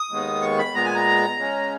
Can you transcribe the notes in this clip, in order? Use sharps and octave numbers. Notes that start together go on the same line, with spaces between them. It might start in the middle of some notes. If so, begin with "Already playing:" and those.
Already playing: D#6
D#2 D#3 G#3 B3
C#6
B5
A#2 G#3 B3 A#5
G#5
A#5
C#3 G#3 C#4